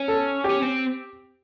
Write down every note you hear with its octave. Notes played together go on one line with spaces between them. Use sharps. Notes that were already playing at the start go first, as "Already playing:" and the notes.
Already playing: C#4
A4
G4
C#4
C4